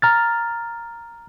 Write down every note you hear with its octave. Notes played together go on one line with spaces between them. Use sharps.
A#5 F6 A6